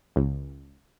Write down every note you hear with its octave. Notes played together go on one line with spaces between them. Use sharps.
C#2